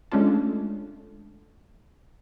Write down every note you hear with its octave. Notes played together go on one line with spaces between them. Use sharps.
G#3 A3 C#4 D4 F4 A4